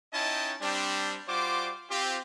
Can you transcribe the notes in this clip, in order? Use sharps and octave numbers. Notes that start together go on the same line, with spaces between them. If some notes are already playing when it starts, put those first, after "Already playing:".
C#4 D#4 E4 D#5 G5 A5
G3 C4 D4
G3 F4 F#4 C5 D6
C4 F4 G4